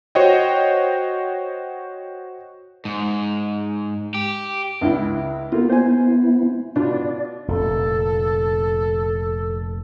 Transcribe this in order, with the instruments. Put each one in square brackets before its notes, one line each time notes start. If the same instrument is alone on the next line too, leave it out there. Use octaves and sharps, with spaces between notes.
[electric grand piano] F#4 C5 C#5 D#5 G5
[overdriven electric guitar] G#2
G4
[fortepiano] C#2 D4 E4
[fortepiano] A#3 F4 [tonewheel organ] B3 E4
[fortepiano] C5 G#5
[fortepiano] B2 D4 F4 [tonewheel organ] D5
[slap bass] F1 A#2 [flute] A4